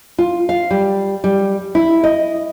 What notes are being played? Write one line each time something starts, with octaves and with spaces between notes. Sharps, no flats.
F4
F5
G3
G3
E4
D#5